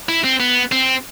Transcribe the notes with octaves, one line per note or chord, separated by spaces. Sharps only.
E4
C4
B3
C4